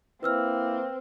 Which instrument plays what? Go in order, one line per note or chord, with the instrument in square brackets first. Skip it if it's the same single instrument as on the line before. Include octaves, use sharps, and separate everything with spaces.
[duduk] A#3 [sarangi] C4 [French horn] E4 [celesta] B4 E6 F6